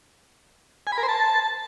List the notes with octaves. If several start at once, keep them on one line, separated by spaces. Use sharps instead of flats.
G#5
B5
A#4
C5
A5